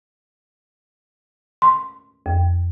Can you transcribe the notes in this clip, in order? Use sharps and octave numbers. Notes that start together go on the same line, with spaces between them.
C6
F2